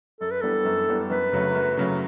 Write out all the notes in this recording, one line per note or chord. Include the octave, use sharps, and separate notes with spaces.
F#2 A4
B4
E3 G3 B3 D4 A4
F#2
E3 G3 B3 D4
F#2 B4
C#3 F#3 A3
F#2
C#3 F#3 A3